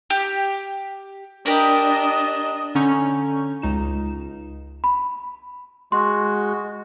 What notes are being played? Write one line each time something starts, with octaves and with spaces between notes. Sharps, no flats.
G4
D4 G4 A#4 D#5 B5
D3 C#4 A#5 C#6 G6
C#2 D#4 E7
B5
G#3 F#4 C6